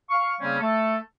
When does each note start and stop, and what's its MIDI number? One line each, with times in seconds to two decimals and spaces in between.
0.09 0.33 77
0.09 0.33 85
0.40 0.58 49
0.40 0.58 55
0.40 0.58 58
0.40 0.58 60
0.40 0.58 61
0.60 0.96 57
0.60 0.96 69